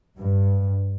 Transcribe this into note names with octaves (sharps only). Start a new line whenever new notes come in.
G2